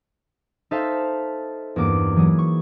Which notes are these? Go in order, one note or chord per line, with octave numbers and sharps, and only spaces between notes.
D#4 A4 C5 E5 F5 A5
E2 G2 A#3 D6
E3 F#3 G#4
C#6